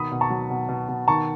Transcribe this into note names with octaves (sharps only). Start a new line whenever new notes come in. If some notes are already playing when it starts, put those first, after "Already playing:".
Already playing: B2 D#3 B5 D#6
B2
A5 C#6
F#3
B2
B2
B2
D#3 A5 C#6